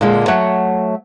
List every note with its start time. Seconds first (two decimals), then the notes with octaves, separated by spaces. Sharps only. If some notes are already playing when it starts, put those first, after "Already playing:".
0.01 A#2 D3 G#3 A#3
0.28 F#3 A3 C#5 F#5